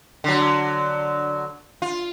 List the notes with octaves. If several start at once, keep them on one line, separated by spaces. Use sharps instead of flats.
D3 F#3
F4